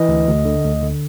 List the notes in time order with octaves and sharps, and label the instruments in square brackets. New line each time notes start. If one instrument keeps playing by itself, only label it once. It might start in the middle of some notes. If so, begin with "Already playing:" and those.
Already playing: [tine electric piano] E3 D#5
D2
D2
D3
D2
D3